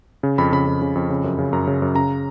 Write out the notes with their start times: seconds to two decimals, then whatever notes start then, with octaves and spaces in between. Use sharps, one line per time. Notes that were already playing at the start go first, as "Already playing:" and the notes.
0.23 C#3
0.38 F2 B5
0.52 C#3 B5
0.67 F2
0.82 C#3
0.95 F2
1.10 C#3
1.24 F#2
1.39 C#3
1.53 F#2 A#5
1.67 C#3
1.82 F#2
1.95 C#3 A#5